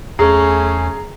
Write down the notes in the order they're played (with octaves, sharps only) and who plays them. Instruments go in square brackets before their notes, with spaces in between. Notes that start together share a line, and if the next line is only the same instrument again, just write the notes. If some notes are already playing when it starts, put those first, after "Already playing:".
[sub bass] E2 [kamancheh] A3 C#4 [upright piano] G#4 [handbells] A#5